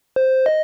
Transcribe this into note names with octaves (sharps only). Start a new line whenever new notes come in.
C5
D#5